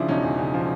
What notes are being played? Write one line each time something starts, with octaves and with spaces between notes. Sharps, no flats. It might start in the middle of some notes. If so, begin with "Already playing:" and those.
Already playing: C#3 F3 D4 E4
E1 C#4 D#4
E2
C#3
F3